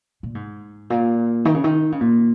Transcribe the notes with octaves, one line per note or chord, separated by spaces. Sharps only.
A#2
G#2
A#2
D#3
C#3
D#3
C#3
A#2